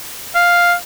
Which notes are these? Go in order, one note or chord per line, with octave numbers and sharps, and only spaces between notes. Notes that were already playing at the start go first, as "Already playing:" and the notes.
F5